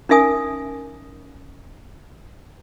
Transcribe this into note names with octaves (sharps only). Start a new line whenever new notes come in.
C#4 D#4 A#4 E5 G#5 D#6